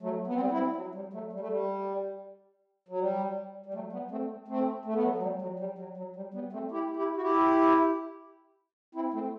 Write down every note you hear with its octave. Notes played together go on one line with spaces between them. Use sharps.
F#3 A3
B3
C4
G3 B3
C4 E4
F#3
G3
F#3 A3
G3
A3
G3
F#3
G3
G3
F#3 A3
G3 B3
A3 C4
A3 C4
A3
B3
F#3 A3
F#3
G3
F#3
G3
F#3
F#3
G3
G3 B3
A3 C4
E4 G4
E4 G4
F#4
E4 G4
C4 E4
A3 C4